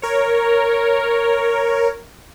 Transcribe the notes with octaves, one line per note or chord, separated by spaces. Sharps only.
A#4 C#5